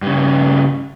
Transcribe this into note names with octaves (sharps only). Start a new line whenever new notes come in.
G2 C#3